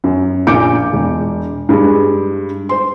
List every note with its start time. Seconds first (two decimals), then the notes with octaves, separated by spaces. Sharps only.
0.04 F#2
0.47 A#1 A#2 D6 G6 C#7 D7
0.93 E1
1.69 G2 G#3
2.69 C5 C6